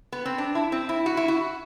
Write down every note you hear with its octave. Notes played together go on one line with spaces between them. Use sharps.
B3
C4
D4
E4
C4
E4
F#4
E4
F#4